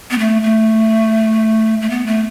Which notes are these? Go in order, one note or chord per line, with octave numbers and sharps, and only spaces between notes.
B3
A3
A3
A3
B3
A3